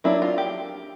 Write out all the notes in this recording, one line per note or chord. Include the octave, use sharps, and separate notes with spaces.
F#3 A#3 D4 E4
F4
G4